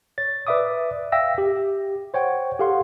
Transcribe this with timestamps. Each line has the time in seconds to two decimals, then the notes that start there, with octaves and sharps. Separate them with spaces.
0.18 C#5 A6
0.47 B4 D5 E5 D6 D#6
1.12 E5 F5 G5 E6 A#6
1.38 G4
2.14 C5 C#5 F#5 G5
2.59 G4 A4 F5 F#5 C6